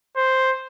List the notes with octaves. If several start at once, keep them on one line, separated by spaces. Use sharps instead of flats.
C5